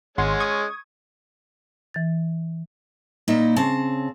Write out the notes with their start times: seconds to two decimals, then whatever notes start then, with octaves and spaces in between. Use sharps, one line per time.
0.18 G#1 G#3 C#4 F#5 C6
0.40 C#6 D#6 G#6
1.94 E3 A6
3.28 A#2 A#3 D#4 E4 D#5 E5
3.56 C#3 C4 A5